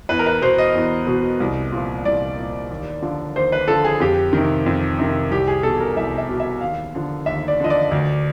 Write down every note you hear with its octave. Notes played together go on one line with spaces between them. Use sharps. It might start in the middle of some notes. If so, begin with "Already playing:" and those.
E2 B4
A#4
B4
B2 C5
D#5
E2
B2
C2
A#2 F3
C2 D5
A#2 F3
D#2
D3 F3
D#2 C5
B4
D3 F3 A4
G#4
F2 G4
C3 D#3
F2
C3 D#3
C2 G4
G#4
B2 A4
A#4
C2 E5
E5
B2
E5
D#2 F5
D3 F3
D#2 E5
D5
D3 F3 D#5
D5
D2